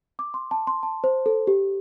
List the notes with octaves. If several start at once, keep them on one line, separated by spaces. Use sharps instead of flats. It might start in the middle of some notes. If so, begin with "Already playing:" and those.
D6
C6
A5
C6
A5
C5
A4
G4